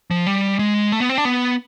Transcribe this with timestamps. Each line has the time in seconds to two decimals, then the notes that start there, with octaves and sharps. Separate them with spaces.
0.11 F3
0.27 G3
0.59 G#3
0.92 A3
1.00 B3
1.09 C4
1.18 D4
1.25 B3